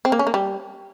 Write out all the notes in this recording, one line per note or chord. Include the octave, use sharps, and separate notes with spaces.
C4
A#3
C#4
A#3
G3